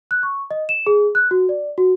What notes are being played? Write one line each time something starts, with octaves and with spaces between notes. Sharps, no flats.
F#6
C#6
D#5
E7
G#4
F#6
F#4
D5
F#4